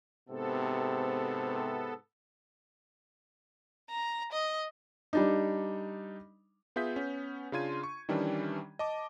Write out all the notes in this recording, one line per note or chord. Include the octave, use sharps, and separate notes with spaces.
G#2 C3 B3 A4
A#5
D#5
G3 D4 D#4
B3 F4 G#4 E5 G6 B6
B3 C#4
C#3 D4 F4 C6 G#6 D#7
C#6
D#3 E3 G3 C#4 D4
D#5 A5 D6